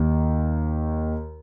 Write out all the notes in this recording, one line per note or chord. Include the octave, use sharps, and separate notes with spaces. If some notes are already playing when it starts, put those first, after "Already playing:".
Already playing: D#2 D#3